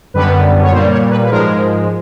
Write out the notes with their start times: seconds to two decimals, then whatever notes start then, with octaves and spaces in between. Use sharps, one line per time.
0.14 F#2 D3 G3 B3 B4
0.62 C#5
0.72 A#2 C5
0.75 G3 A#3
0.91 C#5
1.10 B4
1.24 B4
1.29 G#2 F3 G#3 A#4